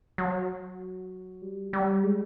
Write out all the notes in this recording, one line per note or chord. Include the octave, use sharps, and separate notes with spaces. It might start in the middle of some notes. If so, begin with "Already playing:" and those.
F#3
G3
G3
G#3